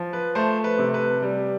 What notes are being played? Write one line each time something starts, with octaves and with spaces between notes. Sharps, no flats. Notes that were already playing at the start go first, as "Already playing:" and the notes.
Already playing: F3
B4
A3 C5
B4
C3
B4
G3